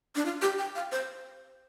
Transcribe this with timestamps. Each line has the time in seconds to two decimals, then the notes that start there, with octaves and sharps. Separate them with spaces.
0.15 D4
0.25 F4
0.42 G4
0.58 G5
0.75 F5
0.92 C5